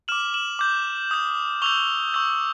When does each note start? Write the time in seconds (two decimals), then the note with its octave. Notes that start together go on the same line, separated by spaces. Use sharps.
0.08 D6 F6 E7 F#7
0.34 E7 F#7
0.59 D6 G6
1.11 D#6 G6
1.62 C#6 E6 G6 F7 G7
2.14 C#6 E6 G6